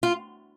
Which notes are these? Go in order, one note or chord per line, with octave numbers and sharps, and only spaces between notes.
F4